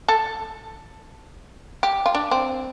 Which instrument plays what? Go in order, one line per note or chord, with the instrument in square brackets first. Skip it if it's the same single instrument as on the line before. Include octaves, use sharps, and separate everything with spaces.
[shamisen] A4
G4
F4
D4
C4